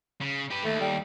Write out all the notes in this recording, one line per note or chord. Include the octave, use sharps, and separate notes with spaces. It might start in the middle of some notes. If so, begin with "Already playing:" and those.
C#3
G4 B4
D#2 A3
G3